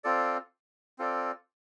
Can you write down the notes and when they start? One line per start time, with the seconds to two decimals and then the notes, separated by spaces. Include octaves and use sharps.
0.04 C4 F4 A4 D5
0.98 C4 F4 A4 D5